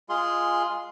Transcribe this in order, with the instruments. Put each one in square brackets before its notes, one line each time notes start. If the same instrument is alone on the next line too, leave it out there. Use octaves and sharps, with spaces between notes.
[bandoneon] G#3 F4 G#4 C6